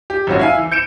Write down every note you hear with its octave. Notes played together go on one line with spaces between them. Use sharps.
G4
G#1 F#3 C#4 F#4
E4 F5 G#5
E3
G6 C#7 D7 E7